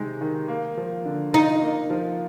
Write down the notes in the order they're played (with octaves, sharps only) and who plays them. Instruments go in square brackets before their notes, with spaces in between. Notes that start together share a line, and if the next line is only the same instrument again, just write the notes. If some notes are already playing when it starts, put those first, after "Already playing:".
Already playing: [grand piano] C3 D#3 G#3 D#4
D#3
A#3
F3
D3
[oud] D#4 [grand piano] F4
[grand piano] A#3
F3